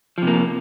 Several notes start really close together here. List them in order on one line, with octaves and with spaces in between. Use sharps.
F3 C3 A#3